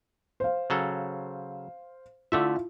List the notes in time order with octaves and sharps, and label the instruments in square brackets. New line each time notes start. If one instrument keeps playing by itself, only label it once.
[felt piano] C5 F5
[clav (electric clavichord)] C#3 F#3 A4
[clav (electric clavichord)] D3 A3 E5 [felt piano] E4 F4